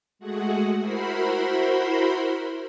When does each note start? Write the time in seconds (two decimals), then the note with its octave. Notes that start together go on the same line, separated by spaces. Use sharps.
0.19 G#3 A3 F#4 G#4 F#5
0.79 E4 F#4 A#4 C5 B5 C6